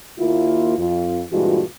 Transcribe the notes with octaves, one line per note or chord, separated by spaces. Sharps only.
D#2 A#3 E4 F4
F2 F4
G2 A#2 E3 G#3 F4 F#4